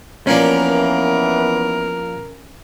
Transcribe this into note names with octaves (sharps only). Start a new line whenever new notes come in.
E3 F3 A#3 B3 C#4 D4 A#4